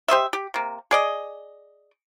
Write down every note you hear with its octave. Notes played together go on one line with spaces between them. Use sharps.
G4 C5 D#5 E5
G4
C3 A#3
G#4 D5 D#5